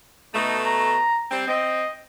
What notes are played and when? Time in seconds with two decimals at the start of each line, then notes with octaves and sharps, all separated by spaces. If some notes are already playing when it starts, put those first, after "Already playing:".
0.35 B2 A3 D#4
0.65 A#5
1.31 G3 C4
1.48 C4 D#5